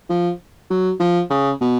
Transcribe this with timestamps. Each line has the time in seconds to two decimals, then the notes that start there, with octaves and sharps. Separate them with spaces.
0.09 F3
0.70 F#3
1.00 F3
1.30 C#3
1.61 B2